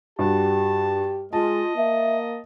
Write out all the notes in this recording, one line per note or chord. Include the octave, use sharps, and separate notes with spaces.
G2 F#4 G4 A5
G#3 F4 D#5 A5
A#3 E5